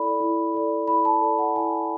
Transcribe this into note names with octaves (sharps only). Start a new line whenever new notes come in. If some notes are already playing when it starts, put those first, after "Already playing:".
Already playing: E4 A4 D5 B5
E4
A4 D5
E4 B5
A5
A4 D5
F#5
E4 G#5